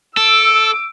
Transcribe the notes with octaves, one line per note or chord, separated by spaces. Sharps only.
A4 D6 E6